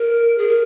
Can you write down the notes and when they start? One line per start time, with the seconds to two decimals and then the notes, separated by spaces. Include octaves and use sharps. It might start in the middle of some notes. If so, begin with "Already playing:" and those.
Already playing: A#4
0.38 G#4
0.49 A#4